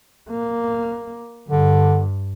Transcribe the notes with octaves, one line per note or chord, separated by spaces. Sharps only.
A#3
G2 D3